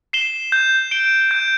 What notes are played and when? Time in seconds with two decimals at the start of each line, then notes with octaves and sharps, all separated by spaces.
0.13 C7 E7 G7
0.52 G6
0.91 D7 G7
1.31 G6